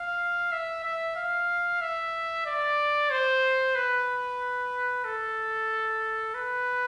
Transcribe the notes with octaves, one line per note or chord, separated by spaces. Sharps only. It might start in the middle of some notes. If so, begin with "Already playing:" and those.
Already playing: F5
E5
E5
F5
E5
D5
C5
B4
A4
B4